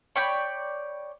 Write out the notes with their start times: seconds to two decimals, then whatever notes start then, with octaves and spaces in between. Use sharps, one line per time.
0.16 C#5 D5 G5 B5